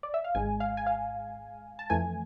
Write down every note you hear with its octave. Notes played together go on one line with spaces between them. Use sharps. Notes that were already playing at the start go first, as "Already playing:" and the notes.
D5
E5
F5
G#1 G#2 G#3 G#5
F5
G#5
F5
A5
F2 E3 A3 G#5